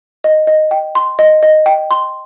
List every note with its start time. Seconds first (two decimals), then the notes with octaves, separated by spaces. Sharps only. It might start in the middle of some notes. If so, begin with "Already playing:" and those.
0.24 D#5
0.47 D#5
0.71 G5
0.95 C6
1.19 D#5
1.43 D#5
1.66 G5
1.91 C6